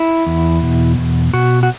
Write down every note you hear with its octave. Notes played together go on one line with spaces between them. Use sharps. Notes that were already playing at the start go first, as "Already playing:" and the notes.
Already playing: E4
E2
B2
E2
B2 F#4
F#4